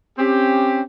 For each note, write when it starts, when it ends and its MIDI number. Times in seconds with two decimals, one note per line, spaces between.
0.19 0.81 60
0.19 0.81 61
0.19 0.81 67